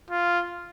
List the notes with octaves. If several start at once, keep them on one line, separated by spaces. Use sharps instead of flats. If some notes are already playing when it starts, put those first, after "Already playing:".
F4